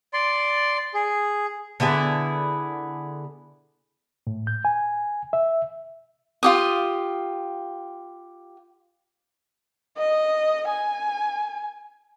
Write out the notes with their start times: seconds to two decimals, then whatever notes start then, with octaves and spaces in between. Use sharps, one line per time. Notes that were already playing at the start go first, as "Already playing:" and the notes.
0.13 D5 C6
0.94 G#4
1.80 D3 B3 E4 G#4
4.27 A2
4.47 G6
4.65 G#5
5.33 E5
6.43 F4 G4 D#6
9.98 D#5
10.68 G#5